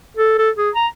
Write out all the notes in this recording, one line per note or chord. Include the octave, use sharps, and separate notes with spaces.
A4
A4
G#4
A#5